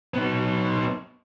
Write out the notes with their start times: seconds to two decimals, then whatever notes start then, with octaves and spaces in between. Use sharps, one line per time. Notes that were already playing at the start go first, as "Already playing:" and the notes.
0.14 B3 D#4